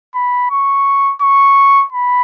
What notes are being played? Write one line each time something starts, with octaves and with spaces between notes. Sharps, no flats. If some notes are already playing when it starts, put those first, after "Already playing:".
B5
C#6
C#6
B5